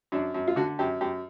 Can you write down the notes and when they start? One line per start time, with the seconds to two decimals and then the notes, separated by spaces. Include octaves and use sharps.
0.12 F#2 D4
0.34 F#2
0.48 F4
0.56 D3 F#4
0.79 F#2 G4
1.01 F#2 G4